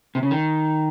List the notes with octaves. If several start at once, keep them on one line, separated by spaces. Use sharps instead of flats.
C3
C#3
D#3